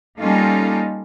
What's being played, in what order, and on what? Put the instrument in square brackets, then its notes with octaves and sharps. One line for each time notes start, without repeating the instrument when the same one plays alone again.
[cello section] G3 A#3 C#4 D#4 F4 A4